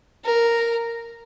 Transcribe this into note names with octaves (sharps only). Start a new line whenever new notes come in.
A#4